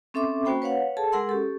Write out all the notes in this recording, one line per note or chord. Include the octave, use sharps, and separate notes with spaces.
C4 C#4 A4 E5 C6 D6
A#3 C#4 F#4 C5 G5 B5
B4 C#5 F5 F#5
G#4 A4 A5
G#3 G#4 A#4 F#5 C6 E6
C#4 G4 A4